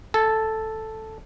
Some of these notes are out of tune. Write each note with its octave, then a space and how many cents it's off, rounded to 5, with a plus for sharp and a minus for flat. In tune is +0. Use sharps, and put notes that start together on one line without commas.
A4 +0 G#5 +35